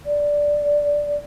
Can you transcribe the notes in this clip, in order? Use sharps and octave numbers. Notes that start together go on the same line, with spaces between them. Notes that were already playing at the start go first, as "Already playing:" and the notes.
D5